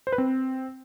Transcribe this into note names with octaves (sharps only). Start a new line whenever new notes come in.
C5
B4
C4